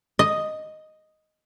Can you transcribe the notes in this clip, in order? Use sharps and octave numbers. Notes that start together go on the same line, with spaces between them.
D#5